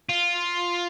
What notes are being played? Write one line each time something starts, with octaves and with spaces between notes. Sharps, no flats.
F4